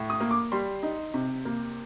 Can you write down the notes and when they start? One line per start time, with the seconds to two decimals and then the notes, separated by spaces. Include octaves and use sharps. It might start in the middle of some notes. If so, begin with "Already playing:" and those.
Already playing: A2
0.10 D#6
0.20 A#3
0.31 D6
0.52 G3 C6
0.83 D#4
1.14 C3
1.45 A#3